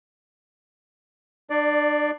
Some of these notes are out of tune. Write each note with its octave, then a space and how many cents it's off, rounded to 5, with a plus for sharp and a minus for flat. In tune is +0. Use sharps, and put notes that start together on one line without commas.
D4 +30 D5 +0